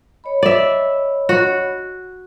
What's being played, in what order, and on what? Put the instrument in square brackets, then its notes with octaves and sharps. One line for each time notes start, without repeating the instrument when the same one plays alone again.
[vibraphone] C#5 D#5 B5
[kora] D5 E5
F#4